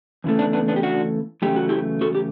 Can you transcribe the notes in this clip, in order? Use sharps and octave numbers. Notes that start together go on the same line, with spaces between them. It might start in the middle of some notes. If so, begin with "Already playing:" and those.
E2 C#3 E3 A3
B3 D4
B3 D4
B3 D4
G4
D4 F#4
E2 C#3 F#3 A3 G4
F#4
E4 G4
F#4 A4
G4